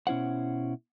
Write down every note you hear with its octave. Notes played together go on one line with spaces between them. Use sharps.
B2 C#4 E4 C5 F#5